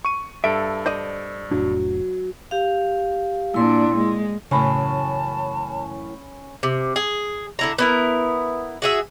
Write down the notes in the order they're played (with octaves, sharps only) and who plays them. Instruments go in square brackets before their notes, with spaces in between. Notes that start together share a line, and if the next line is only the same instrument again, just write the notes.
[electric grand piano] C#6 D#7
[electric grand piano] G2 A4 D7 [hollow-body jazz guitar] E5
[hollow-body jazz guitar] C5 D5 D#5
[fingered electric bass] F1 A2 D4 [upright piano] F#3
[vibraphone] G4 F5
[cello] A#2 D4 [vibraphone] E4 C6
[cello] G#3
[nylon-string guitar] F#2 A2 E3 [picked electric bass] C#3 [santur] C#4 B5 [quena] A5
[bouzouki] C3
G#4
D3 E4 A#5
B3 E4 A#4
F#4 G#4 E5